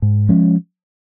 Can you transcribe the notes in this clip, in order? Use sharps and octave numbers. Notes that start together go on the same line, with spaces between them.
G#2
F3 G#3 C#4